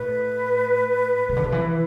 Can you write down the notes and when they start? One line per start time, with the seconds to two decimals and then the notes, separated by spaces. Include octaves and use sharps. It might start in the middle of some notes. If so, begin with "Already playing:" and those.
Already playing: A2 B4
1.29 C3
1.37 D3
1.44 C3
1.52 E3